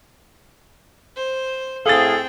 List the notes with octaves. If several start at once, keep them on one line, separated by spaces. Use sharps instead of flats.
C5
A2 C4 G#4 A4 F5 G5 A6